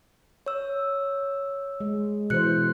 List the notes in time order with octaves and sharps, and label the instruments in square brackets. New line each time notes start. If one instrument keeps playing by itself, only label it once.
[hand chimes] C#5 E6
[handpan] G#3
[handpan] B2 E3 C5 [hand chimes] F#6 C#7